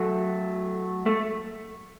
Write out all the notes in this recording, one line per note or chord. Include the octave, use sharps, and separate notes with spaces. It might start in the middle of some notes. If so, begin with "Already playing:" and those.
Already playing: F#3 A3
A3